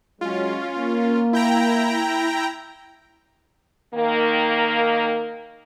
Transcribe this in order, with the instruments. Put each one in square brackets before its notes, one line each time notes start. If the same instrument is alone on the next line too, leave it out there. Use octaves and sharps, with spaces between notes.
[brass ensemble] F#3 G#3 [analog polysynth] C#4 F4
[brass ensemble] A#3
[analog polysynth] E4 G5 A#5
[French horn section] D#3 A#3